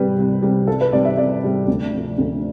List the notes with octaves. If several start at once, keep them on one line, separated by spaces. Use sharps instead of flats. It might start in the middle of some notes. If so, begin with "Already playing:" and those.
Already playing: C2 C3 G3 B4
C2
C3 G3
C2 A4
B4
C3 G3 D5
E5
C2 D5
C3 G3
D2
C3 F3 A3
D2